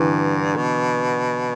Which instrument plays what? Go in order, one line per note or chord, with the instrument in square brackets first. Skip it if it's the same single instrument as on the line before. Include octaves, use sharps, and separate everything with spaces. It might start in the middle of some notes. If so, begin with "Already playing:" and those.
Already playing: [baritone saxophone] G2 [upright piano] D3 E3
[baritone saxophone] B2